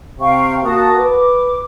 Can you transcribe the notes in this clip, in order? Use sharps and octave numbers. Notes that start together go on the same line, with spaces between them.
C3 F5 G5 C#6
A#3 F#4 A5 D#6
B4 D6